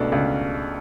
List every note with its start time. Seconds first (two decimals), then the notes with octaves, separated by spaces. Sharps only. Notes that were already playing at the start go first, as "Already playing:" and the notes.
Already playing: C#2 B2 A3 D4
0.12 C#2